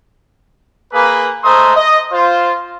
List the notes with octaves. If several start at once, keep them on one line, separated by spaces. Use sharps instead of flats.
A#3 G#4 B4
G#3 A3 C5 A#5 C6 D#6
D#5
F4 C5